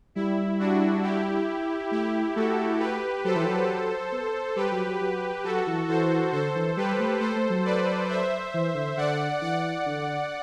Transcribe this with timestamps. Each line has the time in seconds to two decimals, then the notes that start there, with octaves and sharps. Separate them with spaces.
0.15 G3 E4
0.59 D4 F#4
1.03 E4 G4
1.91 A3 E4 G4
2.36 A3 F#4 A4
2.80 G4 B4
3.24 F#3 A4 C5
3.36 E3
3.45 F#3
4.12 B3
4.56 G3 G4 B4
4.72 F#3
4.86 F#3
5.01 F#3
5.44 F#3 F#4 A4
5.67 E3
5.88 E3 A4 C5
6.32 D3 A4 C5
6.55 E3
6.77 G3 G4 B4
7.00 A3
7.20 A3 A4 C5
7.36 A3
7.50 F#3
7.65 B4 D5
8.09 C5 E5
8.54 E3
8.75 D3
8.97 D3 D5 F#5
9.41 E3 D5 F#5
9.86 D3